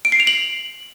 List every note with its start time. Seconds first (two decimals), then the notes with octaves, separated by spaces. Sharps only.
0.05 D7
0.12 C7
0.20 F7
0.27 F#7